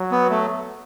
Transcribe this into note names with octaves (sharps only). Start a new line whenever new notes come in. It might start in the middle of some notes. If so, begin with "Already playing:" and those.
Already playing: F#3
B3
A3